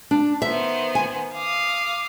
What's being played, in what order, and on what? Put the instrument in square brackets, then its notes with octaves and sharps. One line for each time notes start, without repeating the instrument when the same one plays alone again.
[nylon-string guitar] D4
[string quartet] D#3 B3 C5 [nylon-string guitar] E5
[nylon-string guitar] G#5
[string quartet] F5 D6 D#6